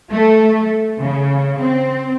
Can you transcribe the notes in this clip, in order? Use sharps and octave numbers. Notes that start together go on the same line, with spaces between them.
A3
C#3
C4